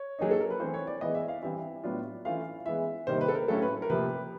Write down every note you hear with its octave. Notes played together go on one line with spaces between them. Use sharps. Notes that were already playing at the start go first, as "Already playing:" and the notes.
Already playing: C#5
F#3 A#3 D#4 G#4
A4
A#4
B4
E3 A3 C4 C5
C#5
D5
E3 G#3 B3 E4 D#5
E5
F5
E3 G3 C4 E4 E5
A2 F#3 B3 D4 F4
E3 A3 C#4 F4 F5
E3 G#3 B3 E5
C3 D#3 G3 A#3 D#4 C5
B4
A4
A#4
A2 F#3 A3 C#4 E4 A4
B4
A#4
C3 F3 A#3 B4